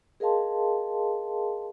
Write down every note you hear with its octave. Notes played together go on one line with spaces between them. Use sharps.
G#4 A#4 D#5 F5 A5 C6